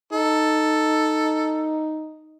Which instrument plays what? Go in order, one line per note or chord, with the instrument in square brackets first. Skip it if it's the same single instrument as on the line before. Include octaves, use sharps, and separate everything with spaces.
[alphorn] D#4 [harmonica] A4